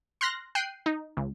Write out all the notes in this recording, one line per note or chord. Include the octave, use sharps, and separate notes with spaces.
C6 F6 F#6 A#6
G5 F#6 C7 D#7
D#4
C#2